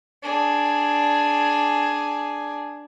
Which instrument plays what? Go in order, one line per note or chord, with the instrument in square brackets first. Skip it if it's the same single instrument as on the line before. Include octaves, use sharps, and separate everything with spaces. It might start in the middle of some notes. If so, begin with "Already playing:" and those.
[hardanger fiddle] D4 G#4